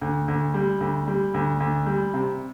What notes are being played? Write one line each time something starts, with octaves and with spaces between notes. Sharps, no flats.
D2
D2
G3
D2
G3
D2
D2
G3
C3